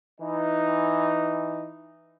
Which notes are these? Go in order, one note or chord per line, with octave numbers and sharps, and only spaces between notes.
E3 D#4